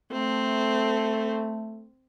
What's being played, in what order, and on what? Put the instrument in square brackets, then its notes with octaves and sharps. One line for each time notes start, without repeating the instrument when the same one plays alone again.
[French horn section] A3 [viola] C4